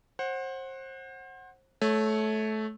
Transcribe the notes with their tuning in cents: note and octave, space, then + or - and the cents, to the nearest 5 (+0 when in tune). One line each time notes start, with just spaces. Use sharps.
C5 +30 F#5 +0
A3 -20 C#5 +0